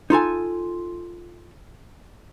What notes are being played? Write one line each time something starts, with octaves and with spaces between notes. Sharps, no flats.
D#4 F4 A4 G#5